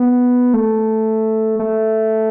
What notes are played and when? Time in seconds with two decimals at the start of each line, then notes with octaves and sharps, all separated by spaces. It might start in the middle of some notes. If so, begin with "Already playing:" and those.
Already playing: B3
0.54 A3
1.59 A3